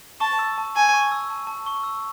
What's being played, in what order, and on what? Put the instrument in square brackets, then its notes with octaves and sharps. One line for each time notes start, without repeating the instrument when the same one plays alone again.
[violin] A5 [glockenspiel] C#6
[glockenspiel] E6
A5
[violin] G#5 [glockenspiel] A5
[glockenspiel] C#6
E6
A5
A5
C#6
E6